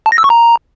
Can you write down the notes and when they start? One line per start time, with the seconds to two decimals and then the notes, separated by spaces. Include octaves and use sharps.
0.06 A5
0.12 A#6
0.18 E6
0.24 C#6
0.30 A#5